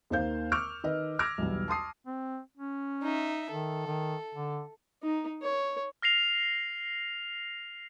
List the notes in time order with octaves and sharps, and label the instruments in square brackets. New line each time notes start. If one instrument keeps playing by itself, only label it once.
[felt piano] D#2 D#3 A#3 C5 F5 G6
C#6 D6 E6 F6 G6 D7
D#3 B4 D#5
D6 E6 F6 G#6 A#6 D7
B1 E2 G3
A5 C6 D#6 C7
[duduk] C4
C#4
[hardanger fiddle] D#4 E5
[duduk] D#3 [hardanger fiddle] A4
[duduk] D#3
D3
[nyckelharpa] D#4
C#5
[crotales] F6 A#6 C7 F7